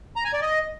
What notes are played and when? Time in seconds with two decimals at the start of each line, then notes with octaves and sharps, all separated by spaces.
0.16 A#5
0.25 G#5
0.33 D5
0.42 D#5